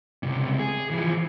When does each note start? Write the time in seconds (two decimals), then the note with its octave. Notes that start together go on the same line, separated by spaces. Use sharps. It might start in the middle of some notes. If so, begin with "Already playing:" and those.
0.23 C#2 C3
0.59 G#4
0.91 E3 F3